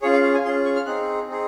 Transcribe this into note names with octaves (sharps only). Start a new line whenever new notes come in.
C#4 F4 G#4 C#5
F5
F5
G#5
C#4 F4 G#4 C6
C#6
F6
C4 D#4 G#4 F#6
C4 D#4 G#4